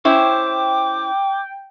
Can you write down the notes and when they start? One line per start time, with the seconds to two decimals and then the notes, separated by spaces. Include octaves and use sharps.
0.05 C#4 E4 C5 G5 D6